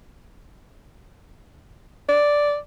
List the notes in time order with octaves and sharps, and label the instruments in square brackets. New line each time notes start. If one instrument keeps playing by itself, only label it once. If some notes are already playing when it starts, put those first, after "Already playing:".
[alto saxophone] D5